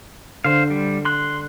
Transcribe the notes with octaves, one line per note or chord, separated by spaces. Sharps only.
D3 C5 F5
G3
C6 F#6